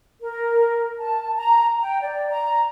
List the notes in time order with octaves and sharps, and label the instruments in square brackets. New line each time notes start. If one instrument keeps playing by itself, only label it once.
[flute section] A#4
A5
A#5
G5
D5
A#5